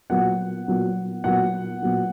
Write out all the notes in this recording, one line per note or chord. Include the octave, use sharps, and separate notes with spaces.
A#2 F#3 B3 F#5
A#2 F#3 B3
A#2 F#3 B3 F#5
A#2 F#3 B3